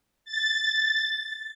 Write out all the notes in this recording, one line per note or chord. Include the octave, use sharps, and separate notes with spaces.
A6